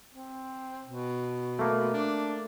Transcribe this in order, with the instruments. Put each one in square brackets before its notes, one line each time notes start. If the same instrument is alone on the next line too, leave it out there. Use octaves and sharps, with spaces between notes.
[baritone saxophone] C4
B2
[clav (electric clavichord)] A3 A#3
[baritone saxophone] D4